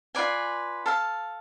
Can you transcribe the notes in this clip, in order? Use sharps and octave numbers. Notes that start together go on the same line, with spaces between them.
F4 B4 D5 G#5
A4 F5 A5